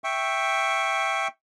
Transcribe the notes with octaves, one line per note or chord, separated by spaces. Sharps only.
E5 G5 C#6